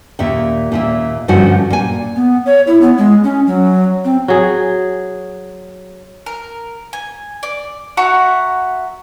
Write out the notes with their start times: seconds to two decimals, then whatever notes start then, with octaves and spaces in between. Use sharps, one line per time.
0.19 D#2 A#2 E5
0.72 D#2 A#2 E5
1.28 G2 D3 F3 A3 C#4 F#4
1.70 A#2 G#5
2.16 B3
2.46 C#5
2.67 E4
2.81 B3
2.98 G#3
3.24 C#4
3.46 F#3
4.04 C4
4.28 F#3 G#4
6.26 A#4
6.93 G#5
7.43 D5
7.97 F#4 E5 F#5 A#5